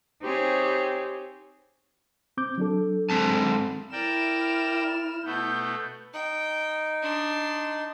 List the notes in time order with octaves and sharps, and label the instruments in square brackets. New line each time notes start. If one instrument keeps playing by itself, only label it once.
[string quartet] C4 D#4 G4 G#4 C#5
[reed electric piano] C4 D6 G6
F#3 D4 A4
[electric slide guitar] G#3 C4 A5
[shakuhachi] E4 [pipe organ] A#4 D5 G5 [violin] F6 E7
[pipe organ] B2 A3 B3 [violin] G6
[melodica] D#4 [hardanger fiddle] G5
[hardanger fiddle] D4 C6